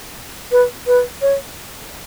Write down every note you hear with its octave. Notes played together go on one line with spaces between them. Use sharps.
B4
B4
C#5